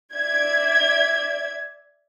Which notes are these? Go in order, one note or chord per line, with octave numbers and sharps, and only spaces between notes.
D5 E5 G#6